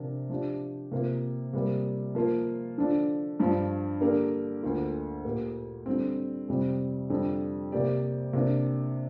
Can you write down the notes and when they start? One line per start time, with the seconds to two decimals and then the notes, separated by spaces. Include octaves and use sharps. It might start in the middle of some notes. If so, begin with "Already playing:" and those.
Already playing: C3 F3 D4 A#4
0.30 F3 D4 G4
0.92 C3 A#3 F4
1.53 C3 G3 A#3
2.15 F3 A#3 F4
2.78 D3 F3 D4
3.40 G2 F3 D4
4.01 D3 A#3 G4 A#4 D5
4.63 D2 D3 A#3 F4
5.25 A#2 A#3 G4
5.86 D3 G3 C4
6.48 F2 C3 G3 C4
7.10 F2 D3 G3
7.72 C3 A#3 G4 D5
8.33 C3 A#3 D4